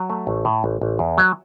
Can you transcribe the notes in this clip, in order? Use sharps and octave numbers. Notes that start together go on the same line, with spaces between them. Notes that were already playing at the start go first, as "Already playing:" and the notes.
Already playing: F#3
A3
A1
A2
A1
A1
E2
F#3